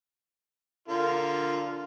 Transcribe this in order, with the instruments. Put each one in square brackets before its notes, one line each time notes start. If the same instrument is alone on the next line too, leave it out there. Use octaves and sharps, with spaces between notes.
[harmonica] D3 F4 A#4